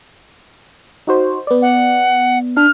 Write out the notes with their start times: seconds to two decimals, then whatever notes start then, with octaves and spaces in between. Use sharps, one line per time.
1.07 D#4 F#4 C5
1.47 B3 D5
1.62 F#5
2.57 D4 F6